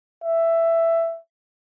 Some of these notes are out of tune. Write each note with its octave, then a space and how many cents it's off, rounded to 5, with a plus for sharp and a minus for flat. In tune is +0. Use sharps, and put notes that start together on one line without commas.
E5 +10